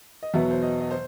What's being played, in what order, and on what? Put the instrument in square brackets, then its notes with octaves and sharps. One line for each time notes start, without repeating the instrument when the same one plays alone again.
[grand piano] D#5
E2 B2 F#3 B3 E5
C5
D#5
D#5
C5